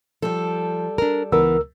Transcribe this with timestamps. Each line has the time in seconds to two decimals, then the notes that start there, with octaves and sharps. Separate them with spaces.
0.22 F3 G3 A4
0.98 D4 A#4
1.32 C#2 E3 B3 A#4 E6